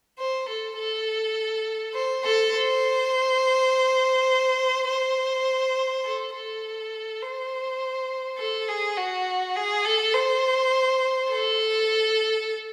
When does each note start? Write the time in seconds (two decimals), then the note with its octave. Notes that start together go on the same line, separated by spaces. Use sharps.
0.19 C5
0.49 A4
0.78 A4
1.94 C5
2.25 A4
2.54 C5
4.88 C5
6.04 A4
6.34 A4
7.22 C5
8.38 A4
8.68 G#4
8.97 F#4
9.56 G#4
9.85 A4
10.14 C5
11.31 A4